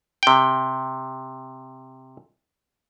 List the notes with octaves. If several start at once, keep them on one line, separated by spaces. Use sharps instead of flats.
C3 G5